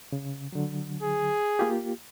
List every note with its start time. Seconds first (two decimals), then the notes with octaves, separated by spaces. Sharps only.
0.12 C#3
0.53 D3 F#3
1.02 G#4
1.59 A#3 F4 G4